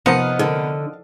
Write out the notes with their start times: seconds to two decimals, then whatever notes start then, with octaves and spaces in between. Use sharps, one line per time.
0.06 C3 F3 B3 D#4 A#4 D#5 F5 F#5
0.39 D3